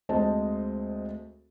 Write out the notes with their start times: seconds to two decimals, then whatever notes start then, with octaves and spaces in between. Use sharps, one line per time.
0.09 D2 G#3 C4 C5 D#5 A5